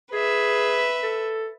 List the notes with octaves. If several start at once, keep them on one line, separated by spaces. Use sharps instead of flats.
G#4 B4 E5
A4